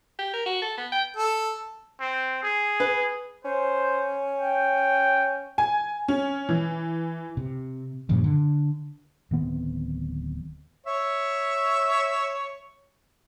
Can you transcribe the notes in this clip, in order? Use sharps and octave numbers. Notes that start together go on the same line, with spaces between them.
G4
A#4
F#4
A4
B3
G5
A4
C4
G#4
B4
C#4 C5
G5
G#5
C#4
E3
C3
G2 A#2 C#3 F3
D3
D1 D#3 B3 C4
C#5 E5